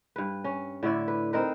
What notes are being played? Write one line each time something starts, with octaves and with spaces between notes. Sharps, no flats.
G2 B4
C#4
A2 D3 E4 D5
B4
C4 D#4 A#4 B4